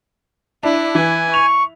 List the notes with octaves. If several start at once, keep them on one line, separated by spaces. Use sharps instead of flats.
D4 E4
E3 G#5
C#6 F7